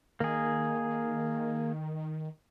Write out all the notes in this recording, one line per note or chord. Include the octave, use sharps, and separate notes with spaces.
D#3 A#3 G#4